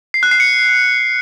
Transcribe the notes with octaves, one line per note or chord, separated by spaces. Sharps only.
C7
F#6
C7
C#7